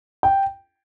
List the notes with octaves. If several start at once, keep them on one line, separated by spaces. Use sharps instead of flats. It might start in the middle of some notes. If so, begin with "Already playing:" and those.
G5